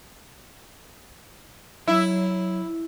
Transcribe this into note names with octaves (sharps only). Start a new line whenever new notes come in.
F#3 E4